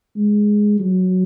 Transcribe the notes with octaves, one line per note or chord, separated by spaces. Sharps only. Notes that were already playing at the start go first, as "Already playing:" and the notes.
G#3
F#3